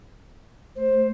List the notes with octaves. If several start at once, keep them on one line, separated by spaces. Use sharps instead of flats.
A3 C5